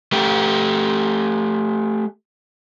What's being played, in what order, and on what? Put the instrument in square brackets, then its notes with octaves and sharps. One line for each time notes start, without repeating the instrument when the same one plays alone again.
[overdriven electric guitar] A3 G4